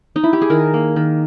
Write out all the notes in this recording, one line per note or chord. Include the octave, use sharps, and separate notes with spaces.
D#4
E4
G4
G#4
D#3 A#4
A#3
D#3